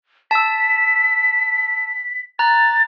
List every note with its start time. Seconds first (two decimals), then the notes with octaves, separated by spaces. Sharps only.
0.31 A5 E6 B6
2.39 A#5 F#6 A6